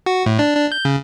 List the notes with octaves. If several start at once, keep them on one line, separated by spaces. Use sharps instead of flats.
F#4
A2
D4
D4
G6
C#3